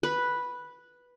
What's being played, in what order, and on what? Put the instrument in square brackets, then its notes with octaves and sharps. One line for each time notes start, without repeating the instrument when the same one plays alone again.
[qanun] B4